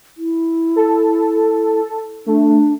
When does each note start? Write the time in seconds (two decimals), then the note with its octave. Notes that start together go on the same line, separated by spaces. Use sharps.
0.17 E4
0.76 A4
2.26 A3 D4